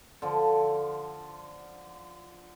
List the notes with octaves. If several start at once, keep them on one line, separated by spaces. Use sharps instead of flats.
D3 F3